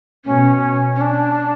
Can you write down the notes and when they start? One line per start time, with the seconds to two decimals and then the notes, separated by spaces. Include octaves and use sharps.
0.24 B2 C#4
0.95 C#4
1.01 D4